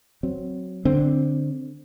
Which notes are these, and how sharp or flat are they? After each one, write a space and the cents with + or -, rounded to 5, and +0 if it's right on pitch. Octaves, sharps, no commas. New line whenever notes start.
F#3 +0 C4 +0
D3 +0 C4 +0